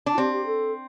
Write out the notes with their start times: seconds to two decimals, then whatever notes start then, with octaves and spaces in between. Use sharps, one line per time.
0.06 D4
0.13 E4
0.18 C4 G4
0.32 G4
0.46 A4